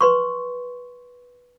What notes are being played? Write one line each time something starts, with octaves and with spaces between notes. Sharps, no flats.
B4 C6 C#6